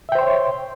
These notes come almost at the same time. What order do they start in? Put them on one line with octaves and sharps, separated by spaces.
E5 G5 C5 C6 C#5